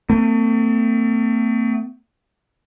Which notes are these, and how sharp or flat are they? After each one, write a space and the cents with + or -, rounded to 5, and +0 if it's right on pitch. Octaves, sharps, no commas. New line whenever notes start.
A3 +35 C4 -35